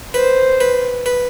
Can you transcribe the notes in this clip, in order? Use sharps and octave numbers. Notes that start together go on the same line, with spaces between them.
B4 C5
B4
B4